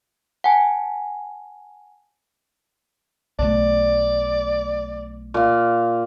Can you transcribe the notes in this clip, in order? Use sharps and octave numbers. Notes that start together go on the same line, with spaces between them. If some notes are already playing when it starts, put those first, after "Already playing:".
F#5 G#5 A5
B1 A3 D5
A#2 F5